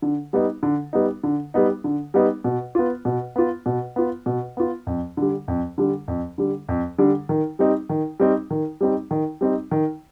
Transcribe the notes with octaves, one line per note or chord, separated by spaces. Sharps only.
D3
G3 B3 D#4
D3
G3 B3 D#4
D3
G3 B3 D#4
D3
G3 B3 D#4
B2
B3 F4
B2
B3 F4
B2
B3 F4
B2
B3 F4
F2
D3 G3
F2
D3 G3
F2
D3 G3
F2
D3 G3
D#3
G3 C4 D#4
D#3
G3 C4 D#4
D#3
G3 C4 D#4
D#3
G3 C4 D#4
D#3